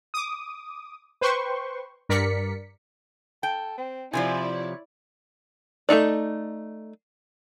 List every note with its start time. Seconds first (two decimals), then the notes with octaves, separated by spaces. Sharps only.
0.14 D6 D#6
1.21 B4 C5 G5 C6 C#6
2.09 G2 A#4 D5 B6 C#7
3.43 A4 G5
3.78 C4
4.13 C3 E3 F3 E4 D5 G#5
4.54 C#5
5.89 A3 C#4 D#4 D5